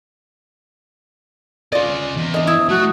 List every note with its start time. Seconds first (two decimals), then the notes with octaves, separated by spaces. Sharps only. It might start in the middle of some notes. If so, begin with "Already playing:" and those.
1.72 C#4 F4 D5 D#5
2.16 E2
2.34 D4 D#5
2.47 E4 D#6
2.70 A3 F#4